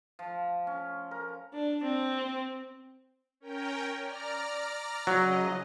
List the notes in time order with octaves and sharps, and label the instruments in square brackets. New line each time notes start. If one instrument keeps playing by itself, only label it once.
[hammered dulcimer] F3
C#4
A#4
[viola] D4
C4
[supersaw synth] C#4 A#4 G5
D5 A#5 F6
[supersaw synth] C#3 D#5 [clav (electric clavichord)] F#3